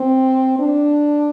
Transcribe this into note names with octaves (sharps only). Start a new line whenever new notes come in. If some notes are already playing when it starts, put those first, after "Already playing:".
Already playing: C4
D4